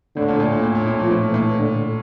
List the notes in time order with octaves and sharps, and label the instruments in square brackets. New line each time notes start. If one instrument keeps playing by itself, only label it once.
[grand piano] A2 [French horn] D3
[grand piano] A#2
A2
A#2
A2
A#2
A2
[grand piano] A#2 [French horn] F3
[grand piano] A2
A#2
[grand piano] A2 [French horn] E3
[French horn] D3